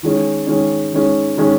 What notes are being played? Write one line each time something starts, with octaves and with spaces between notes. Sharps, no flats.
D#3 G#3 C#4
D#3 G#3 C#4
D#3 G#3 C#4
D#3 G#3 C#4